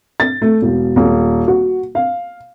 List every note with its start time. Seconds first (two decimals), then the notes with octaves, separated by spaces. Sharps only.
0.20 A6
0.42 A3
0.62 E1
0.96 D#1
1.48 F#4
1.95 F5